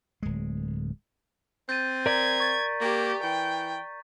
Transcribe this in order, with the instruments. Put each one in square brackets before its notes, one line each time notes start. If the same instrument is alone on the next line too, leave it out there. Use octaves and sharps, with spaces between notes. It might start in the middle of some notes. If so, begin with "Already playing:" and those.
[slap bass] D1 G#3
[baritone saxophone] C4 [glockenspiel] G6 A6 D#7
[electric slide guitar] A#4 D5 [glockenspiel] A#5 B6 [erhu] G#6
[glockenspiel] C#6 A6
[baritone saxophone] A#3 [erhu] G4
[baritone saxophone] E3 [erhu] G5